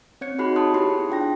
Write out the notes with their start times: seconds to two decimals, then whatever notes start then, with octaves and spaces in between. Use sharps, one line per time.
0.21 C4 C#5 G#6 C#7
0.38 D#4 F#4 G#4 B5 F#6 C7
0.56 C#5 A5 C6 D#6 F#6
0.74 B3 E4 G4 G#4 C6 C7
1.09 D4 F4 G5 A#6